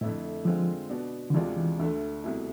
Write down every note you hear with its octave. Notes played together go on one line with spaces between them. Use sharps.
F2 A2 D3 A3 E4
D3 F3 G#3 C4 F4
B2 B3 D4
D3
D2 C3 E3 G#3 D4 F4
E3
D2 D3 A3
C2 B2 A3 E4